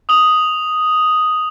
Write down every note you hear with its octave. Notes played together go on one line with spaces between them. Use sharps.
D#6 F#7